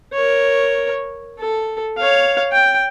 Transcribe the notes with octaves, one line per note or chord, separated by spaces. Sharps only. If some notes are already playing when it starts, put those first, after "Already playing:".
A#4 C#5
A4
C#5 F5
G5